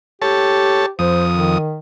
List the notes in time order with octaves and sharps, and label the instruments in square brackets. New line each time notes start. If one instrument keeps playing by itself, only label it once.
[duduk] G4 [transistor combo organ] A4 C#5 A5
[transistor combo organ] F2 D#6 [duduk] C5
[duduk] D#3